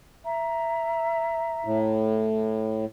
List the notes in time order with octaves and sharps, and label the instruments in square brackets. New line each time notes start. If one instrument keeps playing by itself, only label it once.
[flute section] E5 A#5
[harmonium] A2